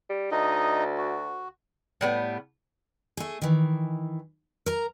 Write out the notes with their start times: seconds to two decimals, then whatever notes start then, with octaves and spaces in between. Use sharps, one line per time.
0.09 G3
0.31 D2 D#4 D#5
0.98 F#4
2.01 A2 G3 B3
3.17 A3 G#4
3.42 D#3 E3
4.66 A#4 A#5